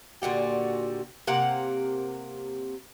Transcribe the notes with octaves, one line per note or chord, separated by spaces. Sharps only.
A#2 D3 F#4 G4
C3 A#3 F#5 A#5